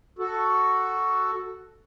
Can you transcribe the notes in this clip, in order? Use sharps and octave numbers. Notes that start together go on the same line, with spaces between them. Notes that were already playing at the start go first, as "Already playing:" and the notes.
F#4 A4